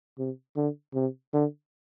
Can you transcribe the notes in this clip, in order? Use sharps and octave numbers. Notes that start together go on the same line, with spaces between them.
C3
D3
C3
D3